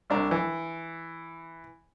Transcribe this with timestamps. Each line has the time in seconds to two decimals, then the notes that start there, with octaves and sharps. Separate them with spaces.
0.10 C2 D4 A#5
0.31 E3